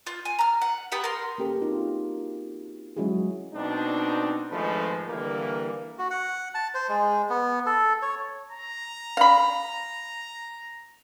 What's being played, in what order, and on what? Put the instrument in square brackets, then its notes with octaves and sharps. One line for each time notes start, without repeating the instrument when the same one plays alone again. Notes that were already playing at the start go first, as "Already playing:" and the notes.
[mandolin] F4 G6
G#5
A#5 F6
F#5
B3 G4 F#5
A#4 C6
[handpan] A#3 C#4 G4 A4 A#4
C4 D#4 F4 F#4
F#3 G#3 C#4 E4 F#4 G#4
[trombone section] B2 C4 D4 D#4
G#1 F3 G#3 A3 B4
D3 E3 G3 A#3
[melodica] F#4
F#5
A5
C5
G#3
B3
A4
C#5
[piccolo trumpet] A#5
[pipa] F5 B5